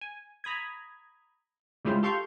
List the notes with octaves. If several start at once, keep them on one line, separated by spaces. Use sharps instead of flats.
G#5
A#5 B5 D#6 G#6
C#3 G3 G#3 E4 F4 C5
G4 A4 F5 C6 C#6 G6